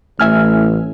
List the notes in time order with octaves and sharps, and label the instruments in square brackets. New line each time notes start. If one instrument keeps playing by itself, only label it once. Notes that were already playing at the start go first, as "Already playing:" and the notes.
[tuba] A1 [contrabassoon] A2 [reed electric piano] E5 G#5 F6